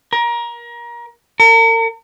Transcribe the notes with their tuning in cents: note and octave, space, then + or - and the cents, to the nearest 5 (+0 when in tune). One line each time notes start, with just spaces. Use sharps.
A#4 +25
A#4 -40